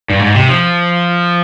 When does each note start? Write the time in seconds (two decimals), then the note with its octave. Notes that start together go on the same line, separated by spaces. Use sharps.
0.10 G2
0.20 G#2
0.35 C3
0.49 F3